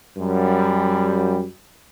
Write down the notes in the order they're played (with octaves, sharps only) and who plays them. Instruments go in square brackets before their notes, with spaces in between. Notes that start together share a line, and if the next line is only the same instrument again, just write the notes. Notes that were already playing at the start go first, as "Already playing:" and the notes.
[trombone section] F#2 G3